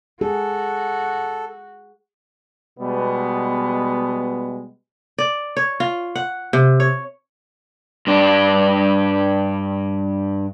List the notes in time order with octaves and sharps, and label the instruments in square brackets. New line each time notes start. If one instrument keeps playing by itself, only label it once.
[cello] F#4 [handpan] G#4 [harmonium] A4
[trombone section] B2 G3 G#3 B3
[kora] D5
C#5
F4
F#5
C3
C#5
[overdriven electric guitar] G2 D4